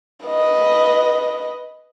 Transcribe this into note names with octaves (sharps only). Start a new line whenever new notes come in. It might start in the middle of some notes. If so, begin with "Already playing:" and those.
B4 D#5